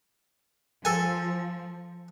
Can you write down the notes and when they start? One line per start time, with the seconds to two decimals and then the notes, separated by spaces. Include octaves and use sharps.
0.85 F3 A4 G#5